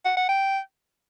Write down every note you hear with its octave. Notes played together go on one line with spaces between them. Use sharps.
F#5
F#5
G5